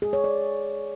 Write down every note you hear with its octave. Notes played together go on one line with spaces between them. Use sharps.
G#4
C#5
D5